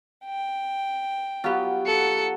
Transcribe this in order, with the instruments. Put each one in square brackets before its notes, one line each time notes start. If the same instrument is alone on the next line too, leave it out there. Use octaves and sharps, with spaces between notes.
[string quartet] G5
[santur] F#3 B3 [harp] F4 G4
[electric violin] A4 C#7